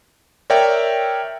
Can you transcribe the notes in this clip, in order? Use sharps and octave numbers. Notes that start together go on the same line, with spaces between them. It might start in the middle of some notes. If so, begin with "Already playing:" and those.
A#4 C#5 D5 E5 G5